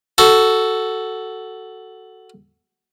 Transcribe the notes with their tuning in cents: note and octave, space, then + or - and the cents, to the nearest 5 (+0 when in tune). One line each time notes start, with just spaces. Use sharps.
F#4 +10 A4 +0